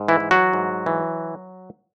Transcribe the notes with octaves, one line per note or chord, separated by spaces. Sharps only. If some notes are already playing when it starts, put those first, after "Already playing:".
Already playing: G#2
E3 E4
E3
F#3 F#4
G#2
E3